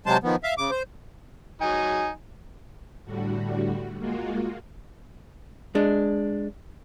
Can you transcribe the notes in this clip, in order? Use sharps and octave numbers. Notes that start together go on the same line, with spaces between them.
C3 F#3 G#3 C5 A5
D#3 F3 B3
E5 F5
C#3 D6
C5
F#3 D#4 G#5
A2 D3 G3 F#4
G#3 A#3 F4 F#4
G#3 D4